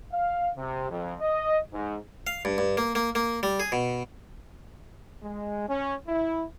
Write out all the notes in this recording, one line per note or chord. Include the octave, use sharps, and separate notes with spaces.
F5
C3
F2
D#5
G#2
F5
G2
G2
A#3
A#3
A#3
G3
G#4
B2
G#3
C#4
E4